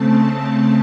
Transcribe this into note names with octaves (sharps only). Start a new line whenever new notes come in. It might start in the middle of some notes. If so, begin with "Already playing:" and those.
Already playing: C#3 A3 C4 A5